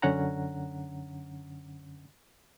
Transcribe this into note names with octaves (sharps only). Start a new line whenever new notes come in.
F#2 D3 C#4 F#5 A#5